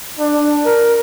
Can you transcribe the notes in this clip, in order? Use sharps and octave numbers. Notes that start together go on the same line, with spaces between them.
D4
A#4